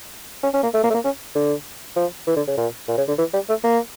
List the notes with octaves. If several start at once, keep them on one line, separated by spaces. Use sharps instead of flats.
C#4
C#4
A#3
A3
A#3
A3
A#3
C#4
D3
F3
E3
D3
C#3
A#2
A#2
C#3
D3
E3
G3
A3
A#3